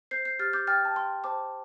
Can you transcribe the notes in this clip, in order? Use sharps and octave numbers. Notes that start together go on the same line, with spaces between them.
C5 G6 C7
G6 C7
G4 F6 A6
D6 G6
G5 F6 A6
A5
G5 C6
C5 A5 D6